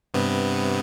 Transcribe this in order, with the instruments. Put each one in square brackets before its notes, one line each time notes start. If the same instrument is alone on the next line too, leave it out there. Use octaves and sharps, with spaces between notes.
[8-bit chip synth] G2 C3 B3